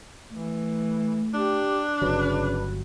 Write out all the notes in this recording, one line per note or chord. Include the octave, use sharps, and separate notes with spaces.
E3 A3
D4 G4
G1 C#3 F#3 B4